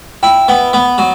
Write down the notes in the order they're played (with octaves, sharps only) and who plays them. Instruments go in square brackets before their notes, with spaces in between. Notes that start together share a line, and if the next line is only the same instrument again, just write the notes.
[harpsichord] E4 [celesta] G5
[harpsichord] B3
B3
F#3